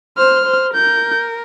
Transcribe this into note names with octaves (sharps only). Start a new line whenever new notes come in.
C5 F6
C5
A#4 G6